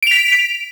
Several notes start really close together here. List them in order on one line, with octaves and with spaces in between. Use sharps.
D7 F7 B6